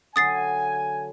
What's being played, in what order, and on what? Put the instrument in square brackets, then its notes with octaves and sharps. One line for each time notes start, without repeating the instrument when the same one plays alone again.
[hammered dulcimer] D3 F#3 [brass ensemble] G#5 [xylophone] D#6 A6 C7